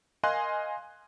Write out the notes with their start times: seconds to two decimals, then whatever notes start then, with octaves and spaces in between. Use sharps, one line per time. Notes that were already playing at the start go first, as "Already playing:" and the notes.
0.23 A#4 D#5 F5 G#5 C6 F#6